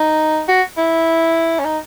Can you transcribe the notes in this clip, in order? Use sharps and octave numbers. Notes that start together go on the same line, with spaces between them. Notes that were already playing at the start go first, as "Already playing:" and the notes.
Already playing: D#4
F#4
E4
C#4
D#4